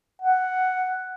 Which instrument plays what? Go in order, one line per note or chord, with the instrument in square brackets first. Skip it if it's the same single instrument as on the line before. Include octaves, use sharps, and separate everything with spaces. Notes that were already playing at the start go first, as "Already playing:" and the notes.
[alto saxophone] F#5